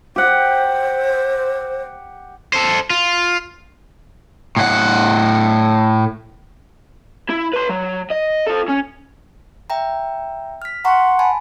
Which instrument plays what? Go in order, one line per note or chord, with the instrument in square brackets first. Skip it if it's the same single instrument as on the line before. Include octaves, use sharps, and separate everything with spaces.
[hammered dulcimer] G4 F#5 [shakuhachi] C5
[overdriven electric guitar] A4 C5
F4
A2 F#5
E4
B4 C6
F#3
D#5
F4 A4
C#4
[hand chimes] E5 G5 A#5
F6 B6
[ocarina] F#5 [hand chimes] A#5 C6 C#6
[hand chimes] G#5 A5 B5